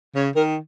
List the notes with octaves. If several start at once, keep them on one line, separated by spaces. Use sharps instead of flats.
C#3 C#5
D#3 A#4